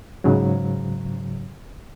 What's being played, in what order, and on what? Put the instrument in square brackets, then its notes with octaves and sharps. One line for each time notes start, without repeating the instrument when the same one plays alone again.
[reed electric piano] G#2 C#3 F#3